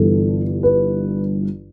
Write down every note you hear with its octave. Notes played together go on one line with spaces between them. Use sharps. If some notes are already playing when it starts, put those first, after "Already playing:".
Already playing: G1 G2 E3 A4
B4